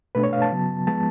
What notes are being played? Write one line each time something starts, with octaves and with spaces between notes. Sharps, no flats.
B2 A3 D4 B4
C#5
F5
A5
C#3 F#3 B3
F3 G#3 B3 A5